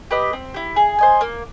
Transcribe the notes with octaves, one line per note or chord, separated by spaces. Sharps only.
G4 B4 D#5
C4
E4 G4
G#4
C5 D#5 G#5
A#3